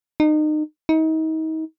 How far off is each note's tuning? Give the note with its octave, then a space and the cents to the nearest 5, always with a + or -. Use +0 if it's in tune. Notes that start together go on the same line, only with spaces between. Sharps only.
D#4 -30
D#4 +35